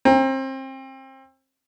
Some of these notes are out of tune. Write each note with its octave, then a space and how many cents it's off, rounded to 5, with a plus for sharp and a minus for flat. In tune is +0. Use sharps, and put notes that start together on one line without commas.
C4 +30 A#5 +5